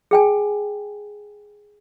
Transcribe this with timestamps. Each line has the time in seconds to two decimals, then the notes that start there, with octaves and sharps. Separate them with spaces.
0.11 G#4 G5 G#5